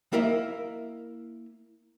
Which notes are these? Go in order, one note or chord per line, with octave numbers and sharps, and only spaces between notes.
A#3 E4 A#4 D#5 E5